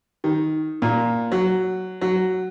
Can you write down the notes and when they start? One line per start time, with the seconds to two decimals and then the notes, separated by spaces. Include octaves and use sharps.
0.24 D#3
0.82 A#2
1.32 F#3
2.01 F#3